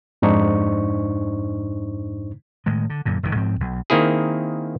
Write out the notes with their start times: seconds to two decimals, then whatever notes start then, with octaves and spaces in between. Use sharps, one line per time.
0.22 F2 G#2 D4 D#4 C5 C#6
2.66 A2 D#3 G#3
2.90 D3
3.05 F#2 A#2 D3
3.23 F1 F#2 C3 D#3
3.35 G#2 F3 C4
3.60 B1
3.90 D#3 A#3 C4 E4 G#4